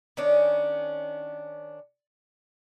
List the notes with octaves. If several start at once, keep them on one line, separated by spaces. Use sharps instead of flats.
D#3 C#4 D4